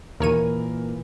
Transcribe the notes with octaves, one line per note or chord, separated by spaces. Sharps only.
D#2 A#2 E3 A#4 C#5 D#7